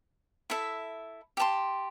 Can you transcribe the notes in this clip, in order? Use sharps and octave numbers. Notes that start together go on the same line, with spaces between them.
E4 A4 E5
G4 E5 A5 C6